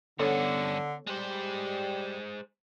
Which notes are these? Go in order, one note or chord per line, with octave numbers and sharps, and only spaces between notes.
G2 D3 B3 C#4 A4 C#5
G3 G#3 C5